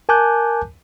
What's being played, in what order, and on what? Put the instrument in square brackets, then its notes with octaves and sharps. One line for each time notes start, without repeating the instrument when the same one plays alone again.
[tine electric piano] A#4 G#5 A5 D6 F#6 G6